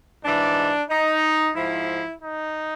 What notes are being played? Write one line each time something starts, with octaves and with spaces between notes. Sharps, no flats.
G#2 E3 D4
D#4
G#2 F3 E4
D#4